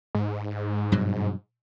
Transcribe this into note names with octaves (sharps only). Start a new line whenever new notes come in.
G#2
G2 B2 F#3